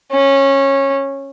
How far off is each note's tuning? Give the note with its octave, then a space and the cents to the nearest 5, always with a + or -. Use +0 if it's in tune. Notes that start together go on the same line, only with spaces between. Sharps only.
C#4 -15